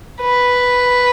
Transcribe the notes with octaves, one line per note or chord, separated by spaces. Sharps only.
B4